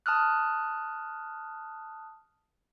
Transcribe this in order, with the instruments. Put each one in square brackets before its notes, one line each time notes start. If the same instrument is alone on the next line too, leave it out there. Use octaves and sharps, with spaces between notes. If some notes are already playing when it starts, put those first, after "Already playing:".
[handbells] A5 D#6 F6 F#6